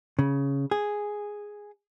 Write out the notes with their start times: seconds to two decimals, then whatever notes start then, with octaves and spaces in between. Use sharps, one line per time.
0.19 C#3
0.71 G#4